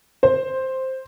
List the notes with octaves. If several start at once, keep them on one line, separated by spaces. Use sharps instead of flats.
C5